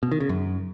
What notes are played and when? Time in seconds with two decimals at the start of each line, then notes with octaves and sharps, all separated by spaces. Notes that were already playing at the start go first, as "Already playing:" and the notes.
0.03 B2
0.12 D#3
0.20 C#3
0.29 F#2